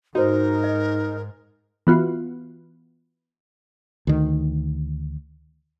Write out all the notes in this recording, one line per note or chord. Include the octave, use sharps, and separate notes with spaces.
G#2 D#4 F#4 A#4 C5
D#5
E3 B3 F4 F#4
D2 D#3